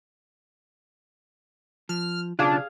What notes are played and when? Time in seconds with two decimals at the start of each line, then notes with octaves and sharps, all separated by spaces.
1.89 F3 F6
2.39 B1 C#3 D4 F4 G#4 F5